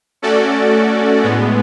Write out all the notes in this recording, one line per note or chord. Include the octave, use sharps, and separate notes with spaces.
A3 C#4 F#4 A4 D5
A2 G#3 B3